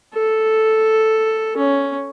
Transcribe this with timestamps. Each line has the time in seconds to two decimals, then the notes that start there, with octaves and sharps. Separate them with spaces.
0.14 A4
1.57 C#4